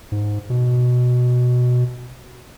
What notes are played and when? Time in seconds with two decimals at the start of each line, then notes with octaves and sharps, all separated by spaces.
0.12 G#2
0.50 B2